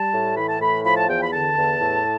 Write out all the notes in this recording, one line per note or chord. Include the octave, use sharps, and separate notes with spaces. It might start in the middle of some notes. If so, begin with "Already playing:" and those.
Already playing: G3 A5
A2
E3 B5
A5
A2 B5
F3 B5
A5
E2 G5
B5
D3 A5
E2
A2